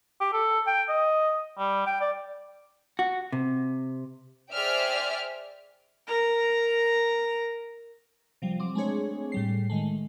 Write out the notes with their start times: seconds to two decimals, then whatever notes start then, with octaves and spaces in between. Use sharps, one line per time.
0.21 G4
0.33 A4
0.67 G5
0.89 D#5
1.58 G3
1.87 G5
2.01 D5
2.99 F#4
3.32 C3
4.51 G#4 C5 D5 E5 G5 F6
6.07 A#4 A#5
8.42 C3 F3 G3
8.59 F#3 C4 D6
8.75 G#3 A3 C4 D4 G#4 C#5
9.32 A2 G3 C7
9.70 D#3 G#3 A3